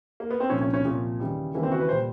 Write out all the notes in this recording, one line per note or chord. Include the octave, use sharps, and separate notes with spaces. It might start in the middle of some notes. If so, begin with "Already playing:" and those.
A#3
B3
C4
C2 A#2 F3 C#4
C#4
C#4
C2 A#2 F3
D#2 C#3 E3 G3
D#2 C#3 E3 G3 A#3
C4
F#4
B4
A#2 G3 C5